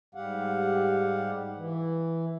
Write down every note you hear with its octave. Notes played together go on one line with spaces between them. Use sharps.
G#2 G3 G4 F5 F#5
E3